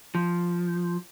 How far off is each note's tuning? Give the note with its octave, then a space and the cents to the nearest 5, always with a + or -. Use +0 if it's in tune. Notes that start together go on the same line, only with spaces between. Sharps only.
F3 +0